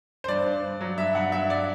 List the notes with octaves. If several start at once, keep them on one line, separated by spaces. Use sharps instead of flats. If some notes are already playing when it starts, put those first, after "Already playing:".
C5
G2 D5
G2
G2
F#3
G2 E5
G2 F#5
G2 E5
D5